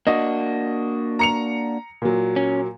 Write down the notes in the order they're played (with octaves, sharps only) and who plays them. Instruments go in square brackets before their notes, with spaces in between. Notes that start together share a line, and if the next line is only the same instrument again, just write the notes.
[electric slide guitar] A#3 D4 F#4 [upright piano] D#5
[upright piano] A#5 C#7 F7
A#2 F#3
[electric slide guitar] C#4